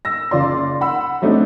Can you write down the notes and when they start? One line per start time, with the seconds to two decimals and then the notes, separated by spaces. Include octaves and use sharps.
0.05 E6 A#6
0.31 F#1 C#3 F4 D5 C6
0.81 F#5 B5 E6
1.22 F#3 A3 C4 D4 D#4